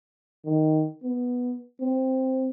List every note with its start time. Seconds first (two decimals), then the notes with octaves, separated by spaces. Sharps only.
0.45 D#3
1.03 B3
1.80 C4